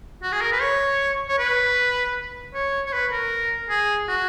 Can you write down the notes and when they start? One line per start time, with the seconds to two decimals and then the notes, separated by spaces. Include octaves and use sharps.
0.22 F#4
0.32 G#4
0.41 A#4
0.52 B4
0.61 C#5
1.29 C#5
1.38 B4
2.54 C#5
2.86 C#5
2.93 B4
3.12 A#4
3.69 G#4
4.08 F#4